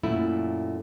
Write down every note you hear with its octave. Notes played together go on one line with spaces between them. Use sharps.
F#2 A#2 A3 E4